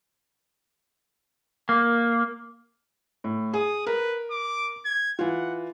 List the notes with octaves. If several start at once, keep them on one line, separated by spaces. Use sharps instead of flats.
A#3
A2
G#4 D#6
A#4 B4
D6
G#6
E3 F4 F#5